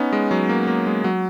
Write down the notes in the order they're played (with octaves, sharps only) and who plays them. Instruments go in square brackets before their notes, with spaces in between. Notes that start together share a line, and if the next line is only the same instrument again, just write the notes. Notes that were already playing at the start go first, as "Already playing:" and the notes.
Already playing: [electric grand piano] B3 C#4 D#4
G#3
F#3
A#3
A#3
G#3
F#3